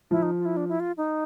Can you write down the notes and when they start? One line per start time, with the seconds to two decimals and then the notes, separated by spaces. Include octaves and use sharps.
0.11 F3 E4
0.22 D#4
0.38 F4
0.45 E4
0.57 D4
0.69 E4
0.80 F4
0.97 D#4